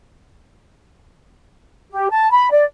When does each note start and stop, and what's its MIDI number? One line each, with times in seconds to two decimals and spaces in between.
1.91 2.09 67
2.11 2.29 81
2.31 2.49 83
2.51 2.64 74